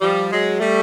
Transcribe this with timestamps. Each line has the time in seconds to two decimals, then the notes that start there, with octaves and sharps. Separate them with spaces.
0.01 F3 G3
0.31 F#3 G#3
0.59 G3 A3